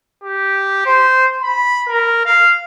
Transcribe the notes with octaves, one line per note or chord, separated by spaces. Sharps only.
G4
C5
B5
A#4
F5